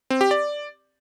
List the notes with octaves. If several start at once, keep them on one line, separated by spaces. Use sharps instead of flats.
C4
G4
D5